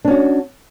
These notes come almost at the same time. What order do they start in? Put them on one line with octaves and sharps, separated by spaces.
D4 C#4 F#4